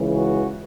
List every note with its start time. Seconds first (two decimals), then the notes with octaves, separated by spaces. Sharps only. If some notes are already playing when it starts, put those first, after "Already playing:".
Already playing: C#2 C#3 E3
0.15 F#4